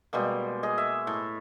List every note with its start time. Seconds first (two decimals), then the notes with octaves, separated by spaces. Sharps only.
0.13 B2 G3 G#3 A#3
0.63 G#4 D#5
0.78 E5
1.07 A2